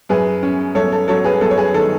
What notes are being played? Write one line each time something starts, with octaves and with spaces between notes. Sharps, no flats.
F#2 G#4 B4
C#4
F#2 A4 C#5
A4
F#3 A4 C#5
G#4 B4
F#2 A4
C#5
G#4 B4
D#3 A4